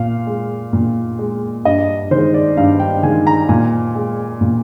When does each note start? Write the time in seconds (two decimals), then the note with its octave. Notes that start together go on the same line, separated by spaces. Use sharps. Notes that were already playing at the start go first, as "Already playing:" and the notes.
Already playing: A#2 F5
0.27 G#3
0.73 A#2
1.19 G#3
1.65 G2 D#5
2.11 D#3 G#3 C5
2.34 D5
2.57 G2 F5
2.80 G5
3.03 D#3 G#3 G#5
3.27 A#5
3.49 A#2 G#5
3.95 G#3
4.41 A#2